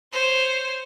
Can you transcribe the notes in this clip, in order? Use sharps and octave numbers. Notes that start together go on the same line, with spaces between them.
C5 C#5